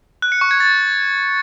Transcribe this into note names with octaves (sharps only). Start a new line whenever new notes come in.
F#6
C#7
C#6
G#6
A6